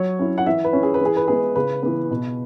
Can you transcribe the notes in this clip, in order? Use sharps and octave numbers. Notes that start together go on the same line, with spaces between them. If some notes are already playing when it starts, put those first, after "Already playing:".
Already playing: F#3 C#5
C#4 E4
F#5
E3 E5
B4
C#4 E4
G#4
B4
E3 G#4
B4
G#3 B3 E4 G#4
C#3 B4
E3 B3
B2